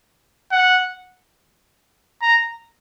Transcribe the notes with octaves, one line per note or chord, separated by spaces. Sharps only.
F#5
A#5